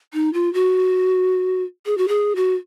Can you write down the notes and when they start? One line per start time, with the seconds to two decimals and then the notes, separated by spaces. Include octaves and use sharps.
0.14 D#4
0.33 F4
0.54 F#4
1.86 G#4
1.98 F#4
2.08 G#4
2.36 F#4